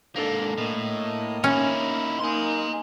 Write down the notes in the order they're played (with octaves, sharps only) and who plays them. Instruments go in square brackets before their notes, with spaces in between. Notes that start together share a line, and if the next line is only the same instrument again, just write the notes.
[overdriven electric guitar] G#2 A#3 [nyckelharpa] D4 A4
[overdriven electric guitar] A2 [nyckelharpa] A#3 D#5
[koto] C#4 [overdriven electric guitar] D#4 E4
[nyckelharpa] A#3 D#4 [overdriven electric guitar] G#5 C6